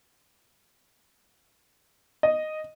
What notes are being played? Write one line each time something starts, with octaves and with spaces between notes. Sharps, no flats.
D#5